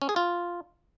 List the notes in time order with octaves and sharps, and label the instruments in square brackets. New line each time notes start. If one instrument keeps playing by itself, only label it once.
[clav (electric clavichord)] C#4
G#4
F4